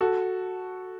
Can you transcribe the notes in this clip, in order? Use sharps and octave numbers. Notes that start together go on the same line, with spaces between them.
F#4 A4